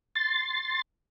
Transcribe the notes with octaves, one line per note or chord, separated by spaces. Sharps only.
C6 A6